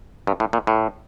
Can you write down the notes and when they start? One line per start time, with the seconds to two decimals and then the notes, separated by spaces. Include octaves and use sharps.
0.27 G2
0.40 A2
0.53 A#2
0.67 A2